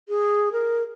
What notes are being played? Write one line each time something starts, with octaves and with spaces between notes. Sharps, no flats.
G#4
A#4